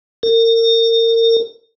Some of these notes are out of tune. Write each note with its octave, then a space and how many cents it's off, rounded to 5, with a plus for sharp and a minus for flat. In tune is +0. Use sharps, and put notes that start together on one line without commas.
A#4 -35